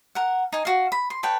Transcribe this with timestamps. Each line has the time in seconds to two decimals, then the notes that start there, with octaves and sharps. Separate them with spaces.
0.15 A#4 F#5
0.53 D#4 G#5
0.65 F#4 F5
0.92 B5
1.10 C6
1.23 A4 B4 C#5 G5